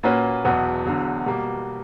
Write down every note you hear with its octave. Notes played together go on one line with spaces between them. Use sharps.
A#2 A#3 C#4 F#4 B4
E1 E2 B2 F#3 B3
E1 E2 D3 F#3
B2 G3 A#3